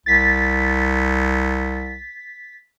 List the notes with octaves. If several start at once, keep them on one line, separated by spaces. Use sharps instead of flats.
C2 A6 B6